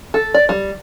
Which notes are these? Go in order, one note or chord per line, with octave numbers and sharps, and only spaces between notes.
A4
D5
G3